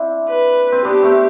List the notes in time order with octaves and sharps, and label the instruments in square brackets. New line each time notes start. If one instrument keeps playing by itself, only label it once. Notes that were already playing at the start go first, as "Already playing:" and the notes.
Already playing: [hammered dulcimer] C4 D4 E4
[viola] B4
[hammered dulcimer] C4
[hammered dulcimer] B3 D4 [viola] G4
[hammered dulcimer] A3 C4